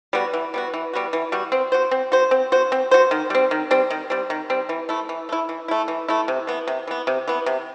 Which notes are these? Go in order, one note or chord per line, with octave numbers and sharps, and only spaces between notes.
G3 B3 F#4
E3
G3 B3 F#4
E3
G3 B3 F#4
E3
G3 B3 F#4
C4
F#4 C5
C4
F#4 C5
C4
F#4 C5
C4
F#4 C5
D#3
G3 C4
D#3
G3 C4
D#3
G3 C4
D#3
G3 C4
E3
A3 E4
E3
A3 E4
E3
A3 E4
E3
A3 E4
C3
E3 B3
C3
E3 B3
C3
E3 B3
C3